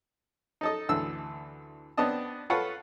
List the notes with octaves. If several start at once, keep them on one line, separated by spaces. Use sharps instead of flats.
D#4 A4 D#5
D2 D3 E3 E6
B3 C4 D4 D#5 A5
F4 A4 B4 C#5 F5 F#5